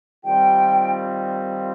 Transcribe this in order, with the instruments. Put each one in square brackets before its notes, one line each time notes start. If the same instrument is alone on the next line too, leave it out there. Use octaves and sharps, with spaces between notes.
[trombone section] D#3 G3 C4 F4 [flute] G5